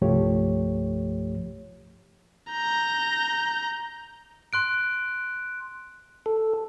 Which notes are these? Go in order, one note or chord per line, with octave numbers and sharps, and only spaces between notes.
C2 G2 F3 A3 G4 C#5
A#5 G6
C6 F#6 D7
A4